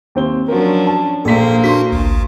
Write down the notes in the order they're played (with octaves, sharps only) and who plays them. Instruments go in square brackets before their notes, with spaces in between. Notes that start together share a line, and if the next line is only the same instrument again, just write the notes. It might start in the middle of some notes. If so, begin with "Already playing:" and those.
[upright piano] D#2 C4 G7
[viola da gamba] F3 C#4 D4 [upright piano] F#3 A#4
[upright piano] A5
[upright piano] A#1 B6 [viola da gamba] A#2 A#3 C5 [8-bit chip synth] A4
[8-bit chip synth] D4 F#4 [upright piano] C6 B6
[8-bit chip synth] A1 D2